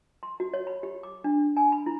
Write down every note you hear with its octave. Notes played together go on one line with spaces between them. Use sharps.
C6
F#4
C#5
B5
G4
D6
D4
G#5
B5
E4